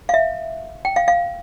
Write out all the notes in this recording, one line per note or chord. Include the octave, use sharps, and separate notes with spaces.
F5
E5
G5
F5
F5